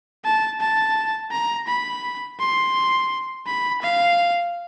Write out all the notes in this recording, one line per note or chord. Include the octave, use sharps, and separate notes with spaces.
A5
A5
A#5
B5
C6
B5
F5